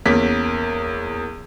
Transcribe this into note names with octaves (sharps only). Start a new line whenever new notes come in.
E2 A#3 C#4 B6